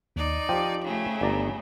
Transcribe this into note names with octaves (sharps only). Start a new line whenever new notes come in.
D#2 D#4 D5
F3 G4 G5
C#3 A3
G1 D5 A#5